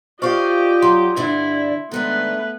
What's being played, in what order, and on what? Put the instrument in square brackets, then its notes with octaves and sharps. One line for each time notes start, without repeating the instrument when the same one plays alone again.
[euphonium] F4 [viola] G4 D#5 [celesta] C5 C#6 [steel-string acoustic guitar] D5 F5
[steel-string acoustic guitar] F#3 [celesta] C6
[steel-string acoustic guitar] G2 D3 D4 [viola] E4
[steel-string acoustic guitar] D#3 G#3 D4 [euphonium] A3 [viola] B3 B4